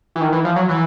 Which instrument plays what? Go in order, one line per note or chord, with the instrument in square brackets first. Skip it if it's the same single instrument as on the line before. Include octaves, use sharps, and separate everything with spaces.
[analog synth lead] E3
D#3
E3
F3
F#3
E3